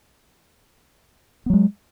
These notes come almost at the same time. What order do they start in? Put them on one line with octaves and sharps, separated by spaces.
B3 F#3 G#3